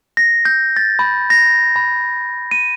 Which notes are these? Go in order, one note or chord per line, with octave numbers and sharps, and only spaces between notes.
A#6
G6
A6
B5
A#6
B5
D#7